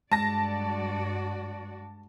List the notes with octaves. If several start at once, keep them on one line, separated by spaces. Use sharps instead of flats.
G2 G#3 F#4 D5 A5 A#6